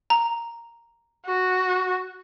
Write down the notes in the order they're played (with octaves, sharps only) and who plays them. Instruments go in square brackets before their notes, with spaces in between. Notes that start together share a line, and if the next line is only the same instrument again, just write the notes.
[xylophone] A#5
[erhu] F#4